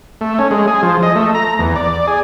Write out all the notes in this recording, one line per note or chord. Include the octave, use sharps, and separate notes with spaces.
A3
C#4
G#3
G#4
F3
D#5
A3
A#5
E2
D5
G#4